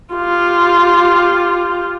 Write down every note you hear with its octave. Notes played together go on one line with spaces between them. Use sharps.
F4 G4